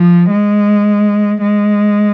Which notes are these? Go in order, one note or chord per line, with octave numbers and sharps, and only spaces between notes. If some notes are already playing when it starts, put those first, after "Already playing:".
Already playing: F3
G#3
G#3